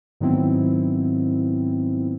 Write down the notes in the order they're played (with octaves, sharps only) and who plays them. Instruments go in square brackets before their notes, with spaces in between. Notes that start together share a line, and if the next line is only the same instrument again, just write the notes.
[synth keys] G#2 D#3 F#3 B3 C4 E4